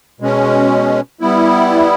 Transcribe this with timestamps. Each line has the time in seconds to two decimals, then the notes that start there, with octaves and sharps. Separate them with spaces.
0.20 B2 G#3 C#4
1.21 G3 B3 E4